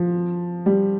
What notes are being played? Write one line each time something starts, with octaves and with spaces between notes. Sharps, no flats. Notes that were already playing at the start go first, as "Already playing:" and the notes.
Already playing: F3
G3